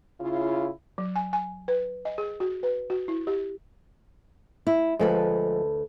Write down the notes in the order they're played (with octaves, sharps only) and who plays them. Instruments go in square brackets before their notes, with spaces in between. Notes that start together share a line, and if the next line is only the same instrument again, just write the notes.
[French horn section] C#3 E4 F4
[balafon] F#3
G#5
G#5
B4
D#5
G#4
F#4
B4
F#4
E4
G4
[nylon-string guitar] E4
[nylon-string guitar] D2 A4 B4 [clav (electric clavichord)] F3 G#3